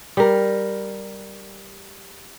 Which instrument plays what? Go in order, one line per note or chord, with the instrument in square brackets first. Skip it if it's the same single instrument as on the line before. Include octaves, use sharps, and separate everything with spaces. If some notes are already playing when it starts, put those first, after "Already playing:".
[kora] G3 A#4